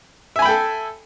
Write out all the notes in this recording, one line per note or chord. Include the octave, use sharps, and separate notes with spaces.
A4 E5 G5 G#5 B5